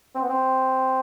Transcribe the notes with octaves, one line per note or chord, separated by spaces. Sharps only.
C4
B3
C4